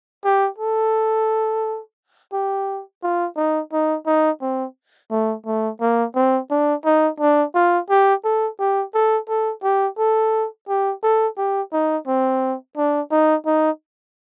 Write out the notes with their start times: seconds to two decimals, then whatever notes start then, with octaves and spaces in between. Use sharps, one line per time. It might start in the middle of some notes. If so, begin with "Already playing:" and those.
0.24 G4
0.58 A4
2.33 G4
3.03 F4
3.36 D#4
3.72 D#4
4.06 D#4
4.41 C4
5.11 A3
5.46 A3
5.81 A#3
6.15 C4
6.50 D4
6.85 D#4
7.20 D4
7.55 F4
7.89 G4
8.24 A4
8.60 G4
8.94 A4
9.28 A4
9.63 G4
9.98 A4
10.69 G4
11.03 A4
11.37 G4
11.73 D#4
12.07 C4
12.77 D4
13.11 D#4
13.46 D#4